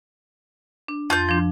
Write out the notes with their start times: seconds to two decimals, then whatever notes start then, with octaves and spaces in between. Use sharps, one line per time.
0.88 D4
1.10 F2 F4 G6
1.29 F3 D4